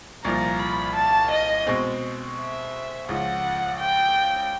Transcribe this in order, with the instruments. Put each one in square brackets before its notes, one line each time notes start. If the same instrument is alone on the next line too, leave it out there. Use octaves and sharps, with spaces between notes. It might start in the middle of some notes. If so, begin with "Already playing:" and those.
[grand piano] C2 A#2 F3 [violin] A#5
[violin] B5
A5
D#5
[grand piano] B2 G#3 C4
[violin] E5
[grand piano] C#2 C#3 F3 [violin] F#5
[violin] G5